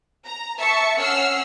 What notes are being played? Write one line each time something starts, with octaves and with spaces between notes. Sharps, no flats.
A#5
E5 A5 C#6 C#7
C#4 F#5 E6 F6 C7